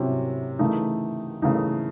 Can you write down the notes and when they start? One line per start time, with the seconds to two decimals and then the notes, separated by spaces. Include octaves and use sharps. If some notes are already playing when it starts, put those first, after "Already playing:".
Already playing: C3 F#3 C#4 E4
0.59 C#3 E3 A3 D#4
1.42 C#3 E3 A3 D#4